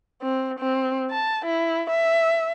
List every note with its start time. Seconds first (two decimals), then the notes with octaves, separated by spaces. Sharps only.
0.22 C4
0.59 C4
1.10 A5
1.45 E4
1.90 E5